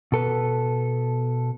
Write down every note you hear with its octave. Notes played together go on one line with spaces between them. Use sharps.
B2 A4 B4